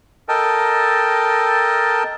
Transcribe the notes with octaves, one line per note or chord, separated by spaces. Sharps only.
A4 A#4 D#5 G5 A5